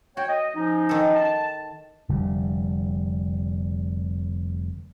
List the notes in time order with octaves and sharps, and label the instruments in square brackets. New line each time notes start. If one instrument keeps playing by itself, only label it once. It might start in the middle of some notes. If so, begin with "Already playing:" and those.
[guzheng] F#4 [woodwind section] C#5 G5
[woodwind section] D#5
F3 C#4 D#4
[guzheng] D#3 A4
[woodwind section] A5
[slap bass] F1 D3 G3